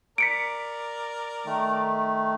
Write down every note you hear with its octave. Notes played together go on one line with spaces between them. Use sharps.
A#4 D5 B6 C#7 D7
D#3 A3